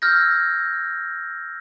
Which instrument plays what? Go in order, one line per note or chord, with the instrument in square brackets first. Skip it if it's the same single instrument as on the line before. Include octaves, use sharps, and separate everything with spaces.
[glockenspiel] E6 F6 G6 G#6 A#6